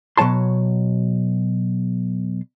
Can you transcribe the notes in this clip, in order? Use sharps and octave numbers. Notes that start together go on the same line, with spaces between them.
B2 F#3 C#5 A5 C6